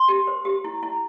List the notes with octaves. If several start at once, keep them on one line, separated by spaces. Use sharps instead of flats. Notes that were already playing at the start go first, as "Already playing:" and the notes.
Already playing: C6
G4
C5
G4
E4
E4